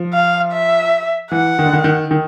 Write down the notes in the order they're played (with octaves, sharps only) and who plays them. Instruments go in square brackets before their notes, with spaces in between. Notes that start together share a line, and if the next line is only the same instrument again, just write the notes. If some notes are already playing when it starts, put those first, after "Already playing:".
Already playing: [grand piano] F3
[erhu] F5
E5
[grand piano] E3 [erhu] F#5
[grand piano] D#3
D3
D#3
D#3
D#3